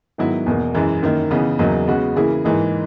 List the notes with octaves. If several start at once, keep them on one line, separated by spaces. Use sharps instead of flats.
G#2 D#3 F#3 B3 E4
E2 B2 A#3
F#2 E3 G#3
F#2 D#3 A#3
C#3 E3 B3 D#4
E2 C#3 F#3 A#3 D#4
C#3 G#3 B3 F#4
C#3 E3 A#3 E4 G#4
G#2 E3 A#3 D#4 G#4